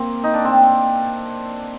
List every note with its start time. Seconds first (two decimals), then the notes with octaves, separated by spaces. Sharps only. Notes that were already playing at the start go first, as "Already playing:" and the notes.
Already playing: A#3 C4
0.23 D#4
0.34 D4
0.45 C4